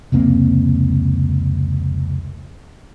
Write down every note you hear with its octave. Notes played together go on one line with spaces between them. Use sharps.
F1 C#2 A#3 C4